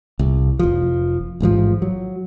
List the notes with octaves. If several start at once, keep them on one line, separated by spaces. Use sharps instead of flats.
C2
F1 F3
A1 G#2 C3 F3
F#3